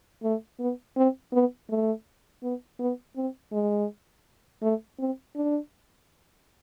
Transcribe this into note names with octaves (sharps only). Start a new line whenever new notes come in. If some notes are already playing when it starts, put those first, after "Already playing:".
A3
B3
C4
B3
A3
B3
B3
C4
G#3
A3
C4
D4